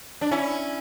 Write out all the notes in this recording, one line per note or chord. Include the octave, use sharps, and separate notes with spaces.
D4
C#4 E4